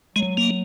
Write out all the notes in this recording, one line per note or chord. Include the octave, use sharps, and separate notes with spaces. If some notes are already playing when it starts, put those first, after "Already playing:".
F#3 G#3
A#3